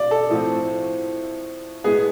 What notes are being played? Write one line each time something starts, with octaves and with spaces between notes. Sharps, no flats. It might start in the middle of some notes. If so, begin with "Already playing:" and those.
Already playing: D5
A4
A2 F3 A3 C4
A2 G#3 B3 G#4